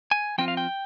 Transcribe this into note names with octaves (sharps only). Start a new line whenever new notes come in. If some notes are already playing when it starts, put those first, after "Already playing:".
G#5
F3 C4 F4 G5
F5
G5